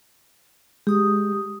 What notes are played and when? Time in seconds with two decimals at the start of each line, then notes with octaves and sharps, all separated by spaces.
0.87 G#3 G4 D#6